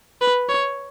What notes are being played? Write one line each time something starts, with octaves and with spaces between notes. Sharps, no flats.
B4
C#5